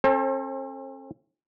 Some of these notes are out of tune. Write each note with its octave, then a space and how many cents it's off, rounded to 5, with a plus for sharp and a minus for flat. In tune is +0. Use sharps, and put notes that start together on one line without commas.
C4 +45 A4 +0 C5 +35